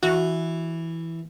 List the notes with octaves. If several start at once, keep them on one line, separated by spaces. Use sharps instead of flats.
E3 F#4